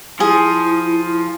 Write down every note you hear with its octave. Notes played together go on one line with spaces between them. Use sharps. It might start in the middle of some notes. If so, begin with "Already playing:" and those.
F3 E4 G#4